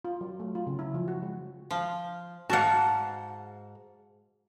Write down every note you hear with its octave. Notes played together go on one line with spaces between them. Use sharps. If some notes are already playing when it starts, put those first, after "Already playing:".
F4
F#3
A3
F4
C#3
E4
F3
F#4
G#3
F3
G#2 F#4 F5 F#5 A5